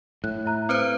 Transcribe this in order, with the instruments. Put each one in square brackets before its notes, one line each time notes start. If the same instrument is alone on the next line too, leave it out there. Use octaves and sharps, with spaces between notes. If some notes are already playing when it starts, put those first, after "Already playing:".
[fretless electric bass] A2 [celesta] F#6
[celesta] E5 A#5 F#6
[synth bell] C4 B4 C5 [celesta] F6